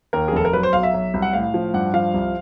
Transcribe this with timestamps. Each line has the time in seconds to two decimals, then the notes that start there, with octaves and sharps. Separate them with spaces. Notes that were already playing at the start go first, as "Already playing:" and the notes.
0.13 D#2 A#4
0.28 G#4
0.33 F1 A4
0.45 A#4
0.53 F#3 B4
0.63 C5
0.73 B1 F5
0.83 E5
0.94 F#3
1.14 C2
1.22 F#5
1.33 A2 F5
1.54 F3
1.74 G2 F#5
1.94 F3 F5
2.14 C2